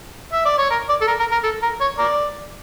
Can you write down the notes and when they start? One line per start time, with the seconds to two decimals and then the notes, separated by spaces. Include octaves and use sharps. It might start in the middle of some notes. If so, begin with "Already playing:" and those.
0.33 E5
0.46 D5
0.58 C#5
0.71 A#4
0.89 D5
1.01 A4
1.08 A#4
1.20 A#4
1.32 A#4
1.44 A4
1.63 A#4
1.81 C#5
1.98 A#4 D5